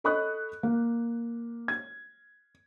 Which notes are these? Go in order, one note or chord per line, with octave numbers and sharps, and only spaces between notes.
A4 D#5 B5 C#6 D#6 F#6
A#3
G#6